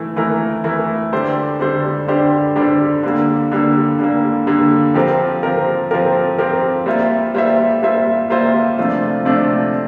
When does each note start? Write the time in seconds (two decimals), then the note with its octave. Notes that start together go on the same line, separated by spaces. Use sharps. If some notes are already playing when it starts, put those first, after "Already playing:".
Already playing: E3 A3 E4
0.16 E3 A3 E4 A#4
0.64 E3 A3 E4 A#4
1.12 D3 G3 D4 G4 C5
1.60 D3 G3 D4 G4 C5
2.07 D3 G3 D4 G4 C5
2.56 D3 G3 D4 G4 C5
3.03 D3 G3 A#3
3.52 D3 G3 A#3
3.99 D3 G3 A#3
4.47 D3 G3 A#3
4.94 F3 C4 G4 A#4
5.43 F3 C4 G4 A#4
5.91 F3 C4 G4 A#4
6.39 F3 C4 G4 A#4
6.86 G3 A#3 F4 C5 E5
7.34 G3 A#3 F4 C5 E5
7.82 G3 A#3 F4 C5 E5
8.30 G3 A#3 F4 C5 E5
8.78 C3 F3 A3 D4 F4
9.25 C3 F3 A3 D4 F4